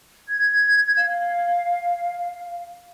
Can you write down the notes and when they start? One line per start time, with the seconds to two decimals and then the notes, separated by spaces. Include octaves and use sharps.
0.29 G#6
0.97 F5